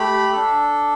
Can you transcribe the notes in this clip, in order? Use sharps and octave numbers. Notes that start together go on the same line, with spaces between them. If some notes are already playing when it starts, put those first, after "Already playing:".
Already playing: A3 G4 B5
D4 A4